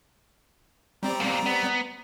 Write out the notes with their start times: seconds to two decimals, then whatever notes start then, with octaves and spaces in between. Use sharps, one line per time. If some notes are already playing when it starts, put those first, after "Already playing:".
1.03 G3 C4 D5 A#5
1.20 E2 A#3
1.46 B3